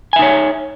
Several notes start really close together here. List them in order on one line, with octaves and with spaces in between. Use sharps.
G#5 E5 D#4 C#5